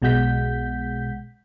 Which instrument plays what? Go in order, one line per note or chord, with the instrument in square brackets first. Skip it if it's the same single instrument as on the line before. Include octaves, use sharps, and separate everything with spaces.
[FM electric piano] B1 B2 G#3 F#5 G6 B6